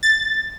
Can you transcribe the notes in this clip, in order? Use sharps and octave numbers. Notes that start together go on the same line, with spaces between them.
A6